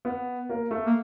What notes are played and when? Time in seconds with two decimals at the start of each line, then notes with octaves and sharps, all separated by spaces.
0.05 B3
0.50 A#3
0.71 A3
0.86 A#3